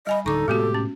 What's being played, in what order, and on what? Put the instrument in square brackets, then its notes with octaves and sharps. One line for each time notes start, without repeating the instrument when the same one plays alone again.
[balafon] G3 G#5 B5 [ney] D#5
[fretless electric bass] D1 D3 D4 [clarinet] D#4 [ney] A4 [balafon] C#6 D6
[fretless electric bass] A2 C3 A3 [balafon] G#3 B3 F#4 [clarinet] G4
[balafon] C#4